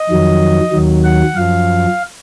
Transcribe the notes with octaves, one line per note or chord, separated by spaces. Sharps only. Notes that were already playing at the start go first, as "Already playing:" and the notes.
Already playing: D#5
F2 D#3 F#3
D#2 D#3 F#3
F#5
F#2 F3 F5